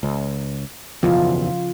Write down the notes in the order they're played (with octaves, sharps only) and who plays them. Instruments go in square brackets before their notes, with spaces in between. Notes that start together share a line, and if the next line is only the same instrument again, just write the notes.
[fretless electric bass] C#2
[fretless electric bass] F#1 B1 E2 [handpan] C#3 F3 F4